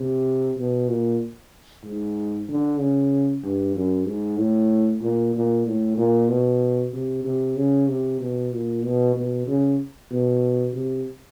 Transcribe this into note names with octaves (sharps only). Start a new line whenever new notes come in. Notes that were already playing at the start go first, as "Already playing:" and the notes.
Already playing: C3
B2
A#2
G#2
D3
C#3
G2
F#2
G#2
A2
A#2
A#2
A2
A#2
B2
C3
C3
C#3
C3
B2
A#2
B2
B2
C#3
B2
C3